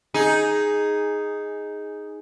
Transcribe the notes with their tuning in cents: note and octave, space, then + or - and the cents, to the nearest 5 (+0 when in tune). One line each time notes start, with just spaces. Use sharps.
D#4 +0 G#4 +0